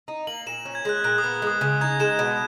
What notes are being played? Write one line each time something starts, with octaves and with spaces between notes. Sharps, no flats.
D#4
A#3 F#7
A#2 E7
C#4
G#6
G#3 F#6
A#2 F#6
D#6
B3
G#3 D#6
C#3
D#4 G#6
G#3 E7
B2